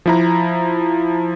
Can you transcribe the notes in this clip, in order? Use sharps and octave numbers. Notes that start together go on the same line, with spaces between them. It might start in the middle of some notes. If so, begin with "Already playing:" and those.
F3 E4 A#5